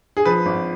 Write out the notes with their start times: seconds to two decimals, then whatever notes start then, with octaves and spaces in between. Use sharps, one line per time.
0.17 G#4
0.25 F3 B4
0.46 G#1